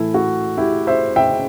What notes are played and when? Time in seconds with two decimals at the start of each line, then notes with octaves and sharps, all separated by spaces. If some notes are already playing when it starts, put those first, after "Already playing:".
Already playing: A2 E3 A3 E4
0.14 F#4
0.58 E4 G4
0.87 C5 E5
1.16 E5 G5